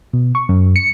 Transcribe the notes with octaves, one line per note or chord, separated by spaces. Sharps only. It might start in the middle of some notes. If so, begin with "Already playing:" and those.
B2
C#6
F#2
C#7